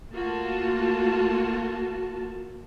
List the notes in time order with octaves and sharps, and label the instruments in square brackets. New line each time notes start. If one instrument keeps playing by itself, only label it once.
[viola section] A3 A#3 F4 F#4 A5